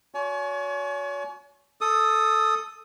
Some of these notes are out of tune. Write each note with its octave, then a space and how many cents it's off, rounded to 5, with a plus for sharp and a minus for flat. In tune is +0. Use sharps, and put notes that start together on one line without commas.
F#4 -30 C#5 +40 G#5 +35
A4 +0 D#6 +0